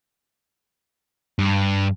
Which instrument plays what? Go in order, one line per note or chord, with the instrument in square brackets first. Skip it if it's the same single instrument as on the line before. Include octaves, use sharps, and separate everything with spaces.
[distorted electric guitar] G2